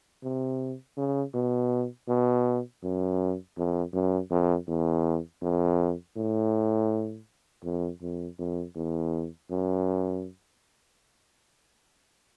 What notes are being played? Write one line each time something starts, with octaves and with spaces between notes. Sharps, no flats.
C3
C#3
B2
B2
F#2
F2
F#2
F2
E2
F2
A2
F2
F2
F2
E2
F#2